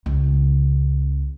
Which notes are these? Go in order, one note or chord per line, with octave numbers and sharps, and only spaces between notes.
C#2 C#3